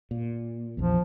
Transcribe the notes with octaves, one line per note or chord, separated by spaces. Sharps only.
A#2
A#1 E2 F3